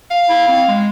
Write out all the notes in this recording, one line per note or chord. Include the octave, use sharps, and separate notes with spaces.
F5
E4
C4
G#3